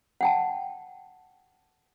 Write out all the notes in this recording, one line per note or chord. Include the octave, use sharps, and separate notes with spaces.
F#5 G5 A5